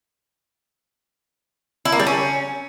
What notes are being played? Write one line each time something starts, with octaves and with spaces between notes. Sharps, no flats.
E4
A#3
G3
C#4